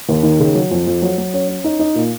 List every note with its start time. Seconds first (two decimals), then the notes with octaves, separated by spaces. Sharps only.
0.09 D#2
0.23 D#3
0.40 C#3
0.55 F#3
0.71 F2
0.87 F2
1.02 F#3
1.18 F#3
1.34 C#4
1.48 C#4
1.64 D#4
1.79 D#4
1.95 A#2